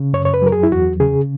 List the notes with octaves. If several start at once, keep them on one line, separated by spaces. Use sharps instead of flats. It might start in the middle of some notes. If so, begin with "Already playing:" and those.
Already playing: C#3
F#2 C#5
C#5
B4
F#3 A#4
G#4
E4
E2 F#4
C#3 G#4